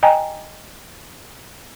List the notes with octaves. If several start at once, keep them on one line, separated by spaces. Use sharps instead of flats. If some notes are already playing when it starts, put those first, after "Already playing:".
D#5 G5 G#5 A#5